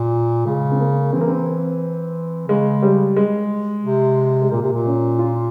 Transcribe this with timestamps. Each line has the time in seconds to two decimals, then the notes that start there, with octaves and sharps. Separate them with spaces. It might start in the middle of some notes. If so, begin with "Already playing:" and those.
Already playing: A#2
0.45 C#3 G#3
0.72 C4
0.80 A#3
1.13 E3 C4
1.21 A#3
1.28 C4
2.48 C#3 G#3
2.82 G3
3.16 G#3
3.84 C3
4.42 G#3
4.51 A#2 A#3
4.62 C3
4.72 A#2
4.86 C#4
5.19 F4